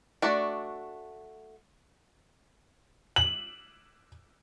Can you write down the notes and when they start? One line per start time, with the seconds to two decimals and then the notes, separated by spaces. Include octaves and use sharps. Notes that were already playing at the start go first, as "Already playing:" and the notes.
0.22 A3 D4 F#4 D5
3.16 F#7